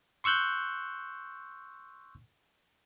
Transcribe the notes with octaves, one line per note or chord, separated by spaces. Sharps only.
C6 C#6 E6 F#6 G6